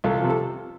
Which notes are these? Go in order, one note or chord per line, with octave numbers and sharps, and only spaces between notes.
C2 F4 A4
C3 F3
A4